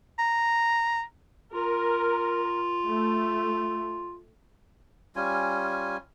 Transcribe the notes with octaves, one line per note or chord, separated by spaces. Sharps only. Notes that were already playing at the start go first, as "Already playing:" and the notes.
A#5
F4 A#4
A3
G3 C#4 F4 G#5